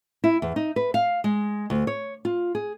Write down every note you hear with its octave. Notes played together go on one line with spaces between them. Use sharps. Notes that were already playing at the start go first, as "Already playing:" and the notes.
E4
E2
D#4
B4
F5
G#3
D2
C#5
F4
G#4